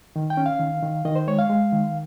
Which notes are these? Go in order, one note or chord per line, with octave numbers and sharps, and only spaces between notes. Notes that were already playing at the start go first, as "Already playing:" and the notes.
D#3
G5
C#4
F5
D#3
D#3
D#3 D#5
C5
G#3 C#5
F5
G#3
D#3